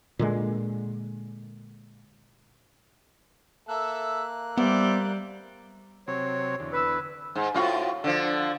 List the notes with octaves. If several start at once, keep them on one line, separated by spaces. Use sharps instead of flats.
A#2 D3 G#3
A#3 A4 E5 F#6
G3 B3 C5 D5 E5
C3 F#3 C4 C#5
E2 D3
B4 E6
G#2
A2 F4 F#4
D3 F3